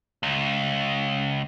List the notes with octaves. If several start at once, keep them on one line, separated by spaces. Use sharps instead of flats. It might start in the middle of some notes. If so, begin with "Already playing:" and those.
C#2